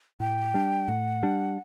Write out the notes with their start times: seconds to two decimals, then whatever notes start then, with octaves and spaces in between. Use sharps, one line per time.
0.20 A2 G5
0.54 G3 D4
0.88 A2 F#5
1.23 G3 D4